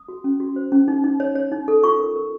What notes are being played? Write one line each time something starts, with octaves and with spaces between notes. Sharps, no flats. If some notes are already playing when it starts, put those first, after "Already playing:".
Already playing: D#6
F#4
C#4
F#4
C5
C#4
D#4
D#4
C#5
C#5
D#4
A4
F4 C#6
A#4
A#4